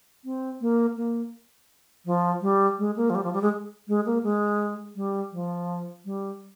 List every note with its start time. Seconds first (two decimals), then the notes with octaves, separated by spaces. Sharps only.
0.25 C4
0.61 A#3
0.97 A#3
2.06 F3
2.42 G3
2.78 G#3
2.96 A#3
3.10 F3
3.15 G3
3.24 F3
3.33 G3
3.42 G#3
3.88 G#3
4.06 A#3
4.23 G#3
4.96 G3
5.32 F3
6.05 G3